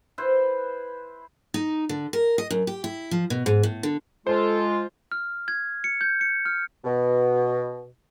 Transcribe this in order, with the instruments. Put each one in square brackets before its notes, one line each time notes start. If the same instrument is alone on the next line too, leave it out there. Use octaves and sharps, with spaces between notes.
[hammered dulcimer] E4 B4 C5
[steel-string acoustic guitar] D#4
D3
A#4
D#5
F#2
G4
E4
F3
B2
G#2
A2
D3
[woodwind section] G#3 F4 [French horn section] A4 [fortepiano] C5
[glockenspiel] F6
G#6
C#7
G6
C#7
F6
[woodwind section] B2